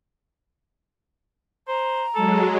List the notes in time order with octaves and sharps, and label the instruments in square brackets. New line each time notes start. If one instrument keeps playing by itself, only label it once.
[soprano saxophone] C5 [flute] A#5
[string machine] F#3 G#3 [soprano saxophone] A4